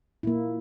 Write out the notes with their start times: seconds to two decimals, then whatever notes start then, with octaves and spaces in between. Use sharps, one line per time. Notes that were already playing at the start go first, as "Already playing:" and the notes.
0.23 A#2 A#3 E4